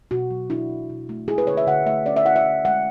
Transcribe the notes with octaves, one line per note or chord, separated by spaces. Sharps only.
B2 F#4
F#3
D4 E4
B2
B2
A3
E4 G#4
B4
D3 C#5
E5
D3 F#5
A3 E5
C#4 D5
E5
E4 F#5
E5
D3
G#3 F#5